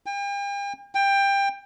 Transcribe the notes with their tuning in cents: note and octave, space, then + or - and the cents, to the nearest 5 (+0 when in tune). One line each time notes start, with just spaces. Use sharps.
G5 +40
G5 +20